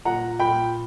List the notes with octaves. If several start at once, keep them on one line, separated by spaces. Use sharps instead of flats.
A#2 F#5 A#5
A#2 G5 B5